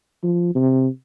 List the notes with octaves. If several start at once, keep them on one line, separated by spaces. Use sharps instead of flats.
F3
C3